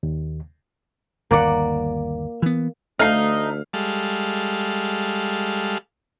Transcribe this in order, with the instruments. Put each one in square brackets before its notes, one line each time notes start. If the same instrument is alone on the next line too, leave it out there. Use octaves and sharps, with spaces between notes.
[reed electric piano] D#2
[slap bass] G1 D#2 [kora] A#3 D5 F#5
[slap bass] E3 B3
[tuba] D2 [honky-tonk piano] A3 C7 [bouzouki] D#4 [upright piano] F5 F6
[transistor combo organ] G3 G#3 A4 F5